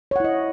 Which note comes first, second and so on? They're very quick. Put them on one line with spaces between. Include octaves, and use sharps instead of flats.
C#5 F#5 E4 D#5